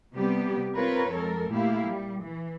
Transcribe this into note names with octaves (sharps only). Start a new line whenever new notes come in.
C3 G3 B3 G4
C4 F4 A#4 B4 C#5
F2 G#3 A4 A#4
A#2 A3 A#3 E4 G4 F5
G3
E3